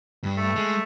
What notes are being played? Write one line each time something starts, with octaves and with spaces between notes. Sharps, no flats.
G2
A3
G#3